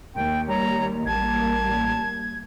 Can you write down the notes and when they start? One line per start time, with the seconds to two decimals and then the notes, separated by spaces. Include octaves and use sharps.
0.15 D#2 G5
0.48 G3 C#5 A#5
1.06 A1 G3 A#3 A5 G#6